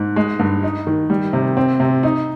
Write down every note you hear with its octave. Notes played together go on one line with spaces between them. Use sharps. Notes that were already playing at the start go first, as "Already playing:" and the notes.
Already playing: G#2
G#3
G2
D#4
D#3
G3
C3
C4
C3
D#4